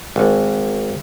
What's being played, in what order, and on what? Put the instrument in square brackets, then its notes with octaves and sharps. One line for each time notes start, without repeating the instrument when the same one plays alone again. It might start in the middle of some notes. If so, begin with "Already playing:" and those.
[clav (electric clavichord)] G#1